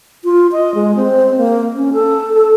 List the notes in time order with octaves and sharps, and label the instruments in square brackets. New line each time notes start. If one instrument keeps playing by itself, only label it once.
[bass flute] F4
D#5
G#3
C4
A#3
C#4
A4
A4